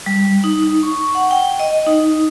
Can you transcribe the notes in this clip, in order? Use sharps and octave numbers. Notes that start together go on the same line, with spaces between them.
G3
D#4
D#4
C#6
F#5
G5
D#5
D#4